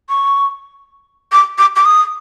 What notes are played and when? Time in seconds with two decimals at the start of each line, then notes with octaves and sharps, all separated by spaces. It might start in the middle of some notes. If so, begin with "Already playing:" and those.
0.09 C#6
1.32 D6
1.58 D6
1.76 D6
1.85 D#6